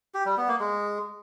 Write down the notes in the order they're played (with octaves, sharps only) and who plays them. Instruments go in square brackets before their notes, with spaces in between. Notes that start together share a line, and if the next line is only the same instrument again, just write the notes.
[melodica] G4
G3
B3
A#3
G#3